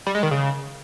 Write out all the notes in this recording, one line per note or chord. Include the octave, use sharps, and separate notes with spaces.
G3
G#3
D#3
C#3